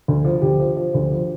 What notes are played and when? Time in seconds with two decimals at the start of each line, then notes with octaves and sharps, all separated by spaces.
0.08 D2
0.25 F3
0.42 D2 G4
0.60 F3
0.77 F3
0.94 D2
1.12 F3